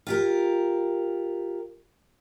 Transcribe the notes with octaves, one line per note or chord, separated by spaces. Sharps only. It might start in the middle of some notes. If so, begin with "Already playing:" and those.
F4 G4 A#4